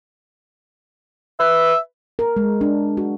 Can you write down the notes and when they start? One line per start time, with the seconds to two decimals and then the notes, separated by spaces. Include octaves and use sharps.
1.40 B4 E5
2.19 A#4
2.37 G#3
2.61 D4
2.97 F#4